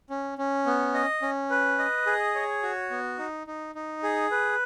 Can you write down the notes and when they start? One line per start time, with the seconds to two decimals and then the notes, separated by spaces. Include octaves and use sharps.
0.10 C#4
0.38 C#4
0.66 B3
0.94 D#5
1.22 C#4
1.50 B4
1.79 D#5
2.06 G#4
2.35 C#5
2.63 F#4
2.91 B3
3.18 D#4
3.47 D#4
3.75 D#4
4.03 G#4
4.31 B4